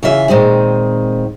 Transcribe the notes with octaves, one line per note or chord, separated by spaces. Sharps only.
C#3 E3 F4 E5
A#2 D#3 G#3 C4